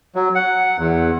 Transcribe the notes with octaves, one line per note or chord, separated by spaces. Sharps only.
F#3
F#5
E2